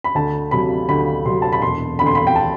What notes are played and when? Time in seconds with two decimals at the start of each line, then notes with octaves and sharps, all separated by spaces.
0.04 B5
0.15 D2 A5
0.51 C3 F#3 B5
0.88 D2 B5
1.25 C3 F#3 C6
1.42 A5
1.52 B5
1.62 E1 C6
1.99 D2 D3 B5
2.07 C6
2.15 B5
2.27 G5
2.36 A5